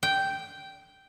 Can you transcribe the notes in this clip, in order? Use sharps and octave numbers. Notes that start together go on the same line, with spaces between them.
G5